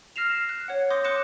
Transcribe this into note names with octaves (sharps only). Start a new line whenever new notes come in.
F6 A#6 C7 E7 F7
C7
F#6
C#5 F#5
C6 D6 D#6 G6 A#6
C6 D6 F#6 C#7 E7